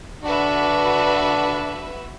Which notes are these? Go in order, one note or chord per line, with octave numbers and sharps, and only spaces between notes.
D3 D4 F#4 B4 E5